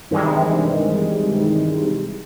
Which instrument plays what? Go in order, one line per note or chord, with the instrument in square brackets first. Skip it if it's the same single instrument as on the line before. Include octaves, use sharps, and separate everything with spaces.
[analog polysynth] G2 C3 D#3 E3 G3 G#3